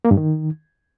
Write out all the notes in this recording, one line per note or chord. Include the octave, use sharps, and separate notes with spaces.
A#3
G2
D#3